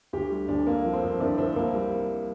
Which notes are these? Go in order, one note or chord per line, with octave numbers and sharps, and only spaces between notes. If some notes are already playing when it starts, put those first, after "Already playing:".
D2 G4
G3
D2 D4
F2 A#3
F3
C4
F2
C2 D4
C2 C4
C2 A#3
G3